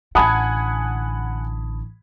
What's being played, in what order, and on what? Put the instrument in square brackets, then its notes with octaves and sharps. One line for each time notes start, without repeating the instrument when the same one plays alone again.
[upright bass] A1 D3 [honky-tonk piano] F#5 G#5 G#6 [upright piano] A5 B5 D#6